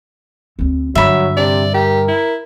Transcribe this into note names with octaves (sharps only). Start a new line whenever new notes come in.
D2 C4
G2 D3 F#3 E5 B5
C3 D5
G4 A#4
E4